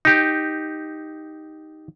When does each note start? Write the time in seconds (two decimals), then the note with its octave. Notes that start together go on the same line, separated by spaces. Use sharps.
0.05 D#4 G4